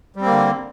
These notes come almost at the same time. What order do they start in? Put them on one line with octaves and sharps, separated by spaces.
G3 C4 A#3 D3